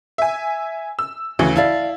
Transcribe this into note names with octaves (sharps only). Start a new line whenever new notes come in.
E5 G#5
E6
D2 C#3 E3 F#4
E4 D5 F5 A5